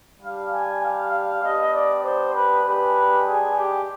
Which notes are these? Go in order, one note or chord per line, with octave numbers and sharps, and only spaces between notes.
G3 D4 G4 F5
G#5
F5
F5
B3 D4 G4 D#5
D5
C5
B4
G#3 D4 G4 B4
G#4
G4